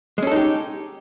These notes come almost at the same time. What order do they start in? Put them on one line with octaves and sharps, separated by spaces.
G#3 C#4 A4 D#4 G4